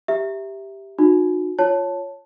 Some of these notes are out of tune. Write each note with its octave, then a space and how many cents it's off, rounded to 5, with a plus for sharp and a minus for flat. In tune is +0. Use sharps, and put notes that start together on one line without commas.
G4 +0 E5 +0 A#5 +5
D#4 -35 F#4 -35
F4 +0 C#5 +0 A5 +0